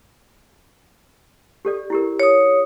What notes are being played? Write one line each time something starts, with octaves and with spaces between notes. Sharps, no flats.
G4 A4 D5
E4 G4 A#4
C#5 D#6